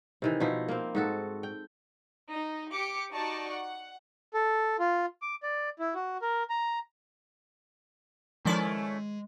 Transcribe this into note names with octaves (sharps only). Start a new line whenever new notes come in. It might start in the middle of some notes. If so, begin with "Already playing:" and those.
C3 D#3 E3
B2 F3 D#4 E4
A#3 C4
G#2 F#4 A4
G5
D#4
G4 D6 C#7
D#4 F#4 D5 A5 C#6
F#5
A4
F4
D6
D5
E4
F#4
A#4
A#5
D#3 F3 G#3 A3 C#4 E4 D5